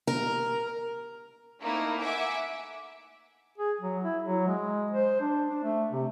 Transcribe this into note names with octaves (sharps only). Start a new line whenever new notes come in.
A#4
A3 A#3 C4 D#4 E4
E5 F#5 G#5 D6
G#4
F#3
E4
F#3
G#3
C5
D4
D4
A3
C3